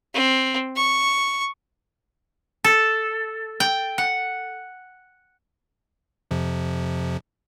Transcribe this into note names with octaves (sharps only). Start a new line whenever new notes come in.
C4
C#6
A4
G5
F#5
F2 C3 F3